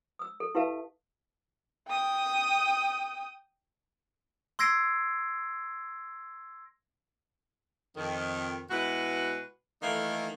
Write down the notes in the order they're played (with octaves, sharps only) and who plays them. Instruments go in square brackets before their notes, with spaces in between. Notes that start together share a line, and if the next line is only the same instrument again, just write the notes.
[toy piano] D#6 E6
A4
E4 G4 B4 E5 F5 A5
[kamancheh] G5 D#6
[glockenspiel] C6 E6 G#6 A#6 C7 D7
[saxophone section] F2 D#3
B2 G#3 E4 F#4 B4
D#3 E3 A3 A#3 D#4 A4